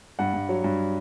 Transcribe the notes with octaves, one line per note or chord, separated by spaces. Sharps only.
G2 F#5
G2
F#3
G2